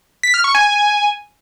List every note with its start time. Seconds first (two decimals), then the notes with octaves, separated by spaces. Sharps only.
0.23 B6
0.34 F6
0.44 C#6
0.55 G#5